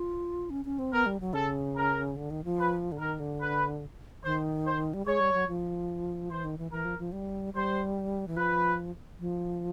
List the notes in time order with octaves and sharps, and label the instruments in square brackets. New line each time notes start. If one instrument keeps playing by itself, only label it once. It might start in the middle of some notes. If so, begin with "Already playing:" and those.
Already playing: [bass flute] F4
C#4
C#4
C4
[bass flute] B3 [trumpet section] A#4
[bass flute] G3
F#3
[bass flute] C#3 [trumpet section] A4
[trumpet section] A#4
[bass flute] D3
D#3
F3
[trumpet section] B4
[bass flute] D3
[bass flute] D#3 [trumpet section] A#4
[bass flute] D3
[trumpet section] B4
[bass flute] D#3 [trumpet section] C5
[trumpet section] C5
[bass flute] G3
[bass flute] G#3 [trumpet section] C#5
[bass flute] G3
F#3
F3
[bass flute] E3 [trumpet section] C5
[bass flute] D#3
E3
[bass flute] E3 [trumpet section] A#4
[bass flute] F3
F3
G3
[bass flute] G3 [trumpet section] C5
[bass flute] E3
[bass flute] F3 [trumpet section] B4
[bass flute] F3